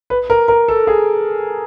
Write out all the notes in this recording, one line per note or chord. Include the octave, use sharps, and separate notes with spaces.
B4
A#4
A#4
A4
G#4